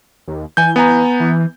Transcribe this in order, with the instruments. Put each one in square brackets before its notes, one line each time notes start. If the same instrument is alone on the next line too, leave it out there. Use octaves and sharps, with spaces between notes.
[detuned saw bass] D#2
[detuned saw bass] E3 [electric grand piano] G#5 G6
[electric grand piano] B3 G#5 A#5
[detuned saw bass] E3